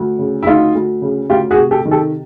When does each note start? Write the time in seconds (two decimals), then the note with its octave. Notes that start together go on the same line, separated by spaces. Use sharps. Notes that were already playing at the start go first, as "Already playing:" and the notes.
Already playing: D2
0.19 C#3
0.43 E4
0.46 D2 D#4 F4
0.75 D2
1.02 C#3
1.30 D2 F4 G4
1.51 F#4 G#4
1.57 C3
1.71 G4 A4
1.85 D#3
1.91 G4 A4